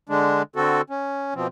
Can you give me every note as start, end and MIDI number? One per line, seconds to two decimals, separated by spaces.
0.09 0.42 50
0.09 0.42 56
0.09 0.42 62
0.56 0.81 50
0.56 0.81 60
0.56 0.81 66
0.56 0.81 69
0.90 1.34 61
1.35 1.47 47
1.35 1.47 53
1.35 1.47 60